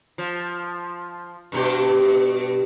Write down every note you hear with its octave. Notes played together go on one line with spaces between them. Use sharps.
F3
G2 B2 G4